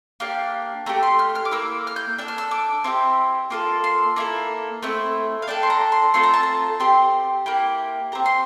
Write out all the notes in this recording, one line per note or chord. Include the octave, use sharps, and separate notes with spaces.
A#3 D4 G4 F5
A3 E4 G4 A#5
C6
F6
F6
D6
A#3 E4 E6
F6
G6
D4 A4 E6
F6
E6
D6
C4 E4 G4
A#3 F4 A4 D6
C6
A#3 E4 A4 A#5
A3 C4 E4
F5
D4 A4 G5
C6
A#5
C6
A3 C4 F4 A4 C6
A#5
A5
A#5
C4 G4 C6
A#3 E4 G4
C4 G4 A#5
C6